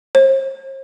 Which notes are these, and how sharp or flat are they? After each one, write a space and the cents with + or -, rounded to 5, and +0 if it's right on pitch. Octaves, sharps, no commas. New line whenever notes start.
C5 +45